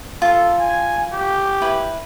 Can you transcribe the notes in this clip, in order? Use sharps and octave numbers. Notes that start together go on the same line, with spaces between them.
F4 A4
G#5
G4
E4 B4